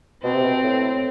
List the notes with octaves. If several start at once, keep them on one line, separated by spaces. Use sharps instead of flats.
B2 C4
C3
B2
A2